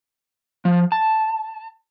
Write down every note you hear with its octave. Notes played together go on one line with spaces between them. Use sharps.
F3
A5